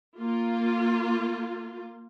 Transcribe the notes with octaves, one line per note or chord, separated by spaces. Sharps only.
A#3 F4